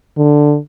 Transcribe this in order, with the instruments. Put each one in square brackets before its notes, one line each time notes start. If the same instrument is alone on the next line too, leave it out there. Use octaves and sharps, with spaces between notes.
[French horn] D3